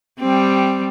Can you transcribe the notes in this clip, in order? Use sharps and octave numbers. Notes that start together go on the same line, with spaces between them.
G3 C4